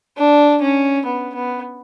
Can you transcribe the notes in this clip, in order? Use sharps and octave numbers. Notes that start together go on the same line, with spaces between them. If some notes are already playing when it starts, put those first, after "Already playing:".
D4
C#4
B3
B3